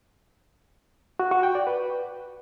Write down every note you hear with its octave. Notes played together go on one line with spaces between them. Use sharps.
F#4
F#4
G5
D5
B4